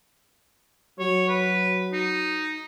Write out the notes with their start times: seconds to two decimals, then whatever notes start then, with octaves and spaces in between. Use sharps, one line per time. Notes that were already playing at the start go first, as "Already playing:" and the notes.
0.99 F#3 C#5
1.29 B4
1.93 D#4